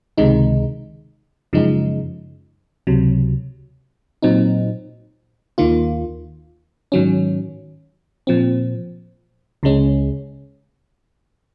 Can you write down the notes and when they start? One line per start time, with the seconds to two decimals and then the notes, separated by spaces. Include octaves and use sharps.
0.18 C#2 C3 D#3 G#3 D#4
1.53 F#2 C#3 F3 G#3 D#4
2.87 C#2 C3 F#3
4.22 A#2 F#3 C4 D#4
5.58 D#2 D#3 A#3 F4
6.92 G#2 D#3 F#3 C#4
8.27 A#2 F3 C4
9.63 C#2 C#3 G#3 C#4